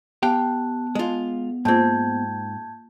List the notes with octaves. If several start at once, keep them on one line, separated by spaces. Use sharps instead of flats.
B3 G4 F5 G5 A5 F#6
G#3 F4
G#2 A#3 C4 F4 A5 G6 G#6